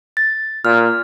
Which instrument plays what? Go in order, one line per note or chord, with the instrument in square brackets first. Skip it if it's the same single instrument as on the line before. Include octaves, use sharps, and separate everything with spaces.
[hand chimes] A6
[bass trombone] A#2 [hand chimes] F6